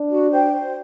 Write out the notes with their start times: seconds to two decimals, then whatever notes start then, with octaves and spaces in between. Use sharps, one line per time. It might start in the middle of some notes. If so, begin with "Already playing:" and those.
Already playing: D4
0.10 F#4
0.31 C5 G5
0.53 C5